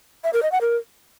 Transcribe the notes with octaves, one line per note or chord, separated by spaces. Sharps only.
E5
A#4
D#5
F#5
A#4